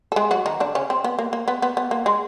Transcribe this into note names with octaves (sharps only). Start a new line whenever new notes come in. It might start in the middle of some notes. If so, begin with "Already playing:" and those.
A4
G#3 G#4
F#3 F#4
D#3 D#4
D3 D4
C#3 C#4
C4
B3
A#3
A#3
B3
B3
B3
A#3
G#3